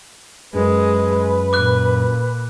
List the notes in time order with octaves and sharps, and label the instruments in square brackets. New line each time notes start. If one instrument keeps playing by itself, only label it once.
[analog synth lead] F#2 [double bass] G#3 [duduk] B4
[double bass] A#2 [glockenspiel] D6 F#6